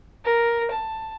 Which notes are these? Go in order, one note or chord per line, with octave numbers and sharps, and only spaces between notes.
A#4
A5